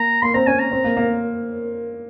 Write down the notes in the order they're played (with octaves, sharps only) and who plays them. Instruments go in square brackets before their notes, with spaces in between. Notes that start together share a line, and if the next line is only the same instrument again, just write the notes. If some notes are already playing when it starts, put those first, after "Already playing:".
Already playing: [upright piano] A#3 [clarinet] A#5
[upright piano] A#3 [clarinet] C6
[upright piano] C4 [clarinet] A#5
[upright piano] C#4 [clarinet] G#5
[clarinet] A#5
[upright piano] C4
A#3
A#3